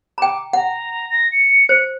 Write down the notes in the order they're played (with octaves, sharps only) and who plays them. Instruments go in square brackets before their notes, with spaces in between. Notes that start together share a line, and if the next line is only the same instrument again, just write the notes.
[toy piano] G5 A#5 [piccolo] D6
[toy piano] F#5 [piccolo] A#5
[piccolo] A#6
C#7
[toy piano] C5